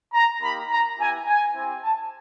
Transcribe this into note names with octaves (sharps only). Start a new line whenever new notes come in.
A#5
A#3 D#4 G4 B5
A#5
B3 E4 G4 G#5
G#5
C4 E4 G4
A5